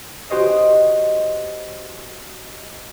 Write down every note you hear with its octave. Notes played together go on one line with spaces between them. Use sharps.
F#4 G4 C5 C#5 D#5